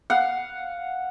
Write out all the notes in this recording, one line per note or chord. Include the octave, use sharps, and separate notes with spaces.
F5 F#5